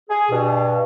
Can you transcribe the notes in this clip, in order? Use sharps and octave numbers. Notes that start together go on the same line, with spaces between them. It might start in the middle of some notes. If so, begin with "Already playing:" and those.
G#4
G2 B2